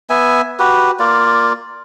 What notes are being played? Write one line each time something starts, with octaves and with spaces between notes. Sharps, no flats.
B3 E5 G#5
F#4 G4 B4
A#3 F4 D5